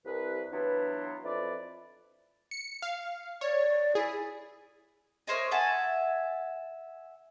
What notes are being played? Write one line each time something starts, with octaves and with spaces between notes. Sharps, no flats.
C2 B4
E3 F#3 B3 D4 E4 F4
F2 E4 B4 D5
C#7
F5
C#5 D5
E4 G#4
A#4 C5 C#5 D#5
E5 F#5 G#5 A5